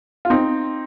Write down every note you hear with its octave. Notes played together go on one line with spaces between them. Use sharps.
F4
C4 D#4